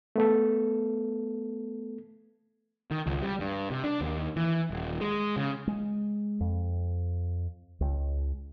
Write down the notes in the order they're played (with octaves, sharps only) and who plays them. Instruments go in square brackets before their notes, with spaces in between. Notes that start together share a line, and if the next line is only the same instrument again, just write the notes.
[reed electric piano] A3 B3 A4
[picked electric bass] D#3
C#2
G3
G2
C3
D4
D#2
E3
D#1
G#3
C#3
[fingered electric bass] G#3
F2
C#2